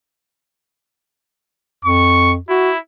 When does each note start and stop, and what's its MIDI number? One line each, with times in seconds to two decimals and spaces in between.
1.85 2.37 41
1.85 2.33 85
2.49 2.78 64
2.49 2.71 66